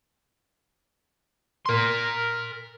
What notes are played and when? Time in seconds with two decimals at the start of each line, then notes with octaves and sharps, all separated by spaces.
1.66 A#4 C6